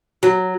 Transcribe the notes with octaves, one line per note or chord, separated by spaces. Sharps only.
F#3